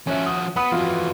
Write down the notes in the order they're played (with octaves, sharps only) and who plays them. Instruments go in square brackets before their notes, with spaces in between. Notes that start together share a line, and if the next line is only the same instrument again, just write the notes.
[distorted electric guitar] F3 F#4 [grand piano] C#4 E5
[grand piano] D#6
[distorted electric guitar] B3 [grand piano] F#5 B5 D#6
[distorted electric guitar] F2 E3 [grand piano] F4 F#4